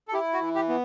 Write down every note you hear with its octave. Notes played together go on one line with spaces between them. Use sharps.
A4
E4 G4
F#4
E3
G4
B3